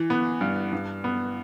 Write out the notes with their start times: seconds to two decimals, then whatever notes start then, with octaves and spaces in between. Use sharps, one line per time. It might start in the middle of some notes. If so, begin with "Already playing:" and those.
Already playing: E3
0.10 B3
0.41 G2
0.73 G2
1.04 B3